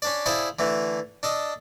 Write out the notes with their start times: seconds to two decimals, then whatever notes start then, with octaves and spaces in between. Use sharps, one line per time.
0.02 C#4 D4 D5
0.26 E4 G#4 A4 C5 D5 F5
0.59 D3 E3 A3
1.23 D4 A4 D#5